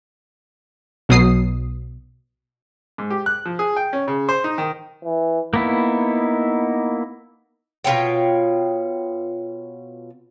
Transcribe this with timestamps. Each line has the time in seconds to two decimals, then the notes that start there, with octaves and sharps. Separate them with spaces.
1.09 B1 B2 F#3 D#6 C7
2.98 G#2
3.10 G4
3.26 F#6
3.45 F3
3.59 G#4
3.77 G5
3.93 C#4
4.08 C#3
4.29 C5
4.44 D#4
4.58 D#3
5.04 E3
5.54 A#3 B3 D#4 E4
7.84 B2 F4 C#5 G5